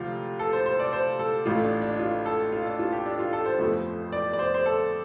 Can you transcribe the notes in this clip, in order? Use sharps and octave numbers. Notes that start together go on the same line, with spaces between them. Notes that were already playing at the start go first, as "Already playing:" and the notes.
Already playing: D2 C3 F3 F4
A4
C5
C5
D5
C5
A4
A1 A2 A3 F4
D4
D4
F4
A4
F4
D4
F4
G4
D4
F4
A4
C5
G1 F2 F3 A3
D5
D5
C5
C5
A4